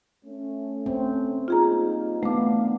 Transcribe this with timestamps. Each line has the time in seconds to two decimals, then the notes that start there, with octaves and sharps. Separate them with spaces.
0.25 A3 C#4
0.86 C4
1.48 G3 A#3 D#4 F4 G#4 A#5
2.23 E3 A3 B3 D4 F5 D6